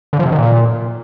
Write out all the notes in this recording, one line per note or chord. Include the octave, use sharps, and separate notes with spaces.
D3
F3
C3
D#3
A#2